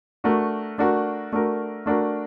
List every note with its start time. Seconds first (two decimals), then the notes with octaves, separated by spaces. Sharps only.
0.24 A3 D4 F#4 A#4
0.78 A3 D4 F#4 A#4
1.32 A3 D4 F#4 A#4
1.86 A3 D4 F#4 A#4